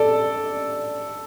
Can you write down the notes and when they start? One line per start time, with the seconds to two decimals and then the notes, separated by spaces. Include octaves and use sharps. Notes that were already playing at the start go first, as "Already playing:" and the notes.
Already playing: A4 D5